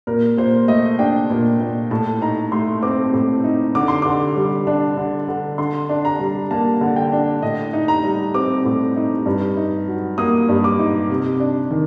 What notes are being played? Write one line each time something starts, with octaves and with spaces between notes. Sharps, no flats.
A#2 A#4
A#2 C5
A3 D#5
D4 G5
A#2
A#2
A2 A5
D#4 A#5
A3 C6
C4 D6
A2
D#4
D3 D6
C6
D3 D6
G3
D4
D3
D3
D3 C6
D4
A#5
G3
A#3 A5
D3
G5
D4
A2 D#5
D#4
A#5
G3
C4 D6
A2
D#4
G2
D#4
F#3
A#3 D#6
G2
D6
D#4
C3
D4
D#3